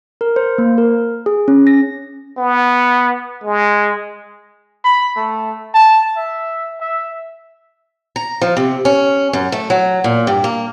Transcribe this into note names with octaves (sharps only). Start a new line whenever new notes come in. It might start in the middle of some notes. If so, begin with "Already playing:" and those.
A#4
C5
A#3
A#4
G#4
C#4
A#6
B3
G#3
B5
A3
A5
E5
E5
A#5
F3
C3
C#4
F#2
A3
F#3
A#2
G2
A#3